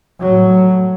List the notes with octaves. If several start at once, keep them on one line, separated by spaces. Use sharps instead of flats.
A2 F#3